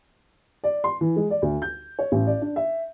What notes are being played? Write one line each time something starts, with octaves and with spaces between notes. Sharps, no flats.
D5
C6
E3
G#3
D5
D2
G6
C#5
A1
D5
D4
E5